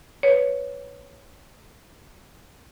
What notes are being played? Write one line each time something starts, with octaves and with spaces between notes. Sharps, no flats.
B4 C#5